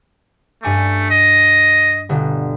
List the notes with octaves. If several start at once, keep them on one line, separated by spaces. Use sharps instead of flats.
G2 A3 G#5 D6
D#5
G1 B2 D3